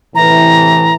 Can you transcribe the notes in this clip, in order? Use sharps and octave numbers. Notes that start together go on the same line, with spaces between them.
A2 C3 E3 A#5